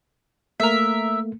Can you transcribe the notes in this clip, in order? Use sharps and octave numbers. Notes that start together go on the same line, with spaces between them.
A3 A#3 A#4 E5